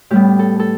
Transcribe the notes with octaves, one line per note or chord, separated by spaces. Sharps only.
A2 G3 B3 G4
A4
A4